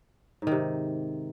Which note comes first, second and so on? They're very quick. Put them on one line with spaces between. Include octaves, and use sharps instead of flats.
G#2 D#3 C3